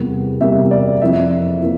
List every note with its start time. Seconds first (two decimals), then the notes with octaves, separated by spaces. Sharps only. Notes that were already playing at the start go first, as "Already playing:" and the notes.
Already playing: E2 C3 G3 A#3
0.40 E2 C3 G3 A#3 E5
0.71 D5
1.01 F2 E3 A#3 E5
1.62 E3 A#3